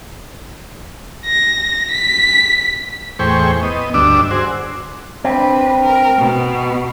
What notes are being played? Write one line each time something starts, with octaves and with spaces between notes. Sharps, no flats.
A#6
B6
E2 A2 G#4 C5 G5 C#6
B3 D#5
D2 G2 D4 D6 E6
F#4 G#4 C5
C4 D4 B4
A#4
B2